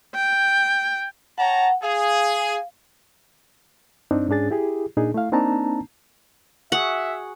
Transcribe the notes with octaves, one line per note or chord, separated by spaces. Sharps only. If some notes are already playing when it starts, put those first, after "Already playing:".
G5
C#5 F#5 G5 A5 A#5
G#4 F5
G2 C4 D4 D#4
G#2 C#4 D4 G#4 A6
E4 G4 G#4
A#2 D4 D#4 G#4
A3 E4 F5
A#3 C4 D4 D#4 A5 A#5
F#4 G#4 E5 F#5